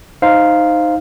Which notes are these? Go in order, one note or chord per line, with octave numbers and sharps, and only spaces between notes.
D#4 C5 F5